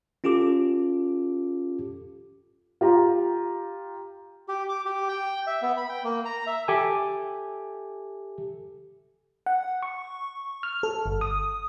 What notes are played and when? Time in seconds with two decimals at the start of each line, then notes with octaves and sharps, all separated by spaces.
0.24 C#4 F4 G4 A4 D6
2.81 F4 G4 A#5
4.48 G4
4.69 D6
4.85 G4
5.09 G5
5.47 E5
5.62 B3
5.77 B5
5.89 G5
6.04 A#3
6.25 A#5
6.47 E5
6.68 G4 A4 E5 G#5 A5
9.46 F#5
9.83 C#6
10.63 F6
10.83 A4
11.06 G1
11.21 D#6